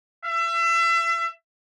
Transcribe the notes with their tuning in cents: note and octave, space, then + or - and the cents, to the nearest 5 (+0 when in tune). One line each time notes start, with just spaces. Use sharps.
E5 +30